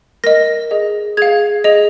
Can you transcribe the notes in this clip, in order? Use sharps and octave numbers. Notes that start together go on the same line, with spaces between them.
A#4 D#5 A#6
G#4 D#5
G#4 F5 G#6
G#4 D#5